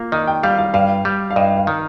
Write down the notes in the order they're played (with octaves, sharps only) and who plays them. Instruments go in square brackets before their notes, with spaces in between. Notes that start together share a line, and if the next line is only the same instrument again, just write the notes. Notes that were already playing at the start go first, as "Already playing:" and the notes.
Already playing: [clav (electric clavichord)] A#3 [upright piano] F4
[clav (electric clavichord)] D#3 [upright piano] D#5
[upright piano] G5
[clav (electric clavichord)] G3 [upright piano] F5
[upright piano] F5
[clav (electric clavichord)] G2 [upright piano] F5
[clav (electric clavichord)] G3
[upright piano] F5
[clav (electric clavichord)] G2 [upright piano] D#5
[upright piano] F5
[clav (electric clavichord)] D#3